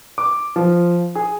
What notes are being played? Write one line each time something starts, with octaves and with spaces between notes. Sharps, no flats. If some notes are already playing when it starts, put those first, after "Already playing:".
D6
F3
G#4